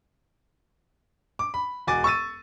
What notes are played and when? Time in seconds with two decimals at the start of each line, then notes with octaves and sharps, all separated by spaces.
1.39 D6
1.54 B5
1.87 E1 F#4 G#5 D6 A6
2.04 C#6 E6 A6 D#7